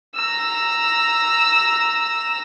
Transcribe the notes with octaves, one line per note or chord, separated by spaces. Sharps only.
A#5 E6